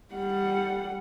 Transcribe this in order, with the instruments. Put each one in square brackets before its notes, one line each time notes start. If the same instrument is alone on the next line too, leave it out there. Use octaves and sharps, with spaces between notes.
[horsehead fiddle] G3 F#5